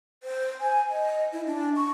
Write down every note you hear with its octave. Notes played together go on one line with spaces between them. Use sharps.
C5
G#5
D#5
E4
D4
C#6